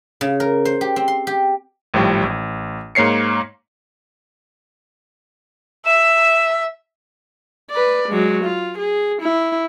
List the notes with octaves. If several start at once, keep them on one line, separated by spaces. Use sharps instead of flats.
C#3
A#4
C5
G4
C4
C6
G4
G#1 A2 F3 G3
A1
G#2 A#3 C#5 C7 C#7
E5 E7
B4 D5
F#3 G#3
F4
G#4
E4